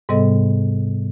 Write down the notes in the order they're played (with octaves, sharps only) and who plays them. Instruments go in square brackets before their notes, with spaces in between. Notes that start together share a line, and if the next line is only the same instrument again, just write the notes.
[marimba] G#2 C3 G3 B3 A4 D#5